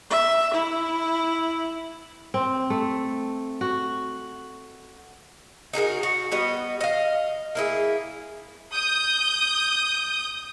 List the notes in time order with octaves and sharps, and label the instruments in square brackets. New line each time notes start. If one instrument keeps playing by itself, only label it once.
[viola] E5
E4
[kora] C4
A3
F#4
[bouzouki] D#4 F#4 G#4 A#4
F#4
G3 B3 F#4 D#5
D#5 F5
A#3 E4 G#4
[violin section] D#6 G6